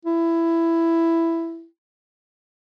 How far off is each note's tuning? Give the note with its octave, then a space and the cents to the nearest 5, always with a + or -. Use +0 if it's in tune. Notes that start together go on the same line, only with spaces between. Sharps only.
E4 +10